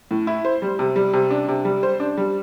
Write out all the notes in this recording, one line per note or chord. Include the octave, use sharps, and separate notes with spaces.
A2
E4
C5
G3
C3
G3
C3
D4
C3
G3
C5
D4
G3